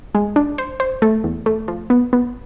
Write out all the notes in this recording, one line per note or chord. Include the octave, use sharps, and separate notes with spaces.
G#3
D4
C5
C5
A3
E2
A3
F3
B3
B3